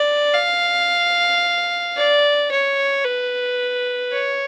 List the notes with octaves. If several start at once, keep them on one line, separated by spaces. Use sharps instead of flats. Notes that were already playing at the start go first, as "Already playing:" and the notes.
Already playing: D5
F5
D5
C#5
B4
C#5